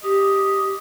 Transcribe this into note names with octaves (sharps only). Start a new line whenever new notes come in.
G4 D#5